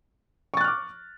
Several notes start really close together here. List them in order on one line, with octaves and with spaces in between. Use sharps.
C#6 A6 F#6 F6 D6